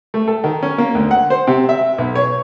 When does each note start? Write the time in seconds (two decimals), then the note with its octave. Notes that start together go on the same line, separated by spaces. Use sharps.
0.14 A3
0.28 A4
0.44 D#3
0.63 C#4
0.78 A#3
0.95 D2
1.11 F#5
1.30 C5
1.47 C3
1.69 E5
1.98 B1
2.15 C#5